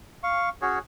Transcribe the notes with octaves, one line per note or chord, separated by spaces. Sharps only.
F5 C#6
C#4 F#4 G#4 C#5